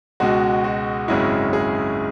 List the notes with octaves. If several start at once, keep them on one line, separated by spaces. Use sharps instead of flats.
C#2 B2 G#3 F#4
F#4
G#1 F#2 C#3 G#3 E4
G#4